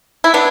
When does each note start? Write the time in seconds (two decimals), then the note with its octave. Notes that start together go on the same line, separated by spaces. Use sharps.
0.24 E4
0.34 B3 D4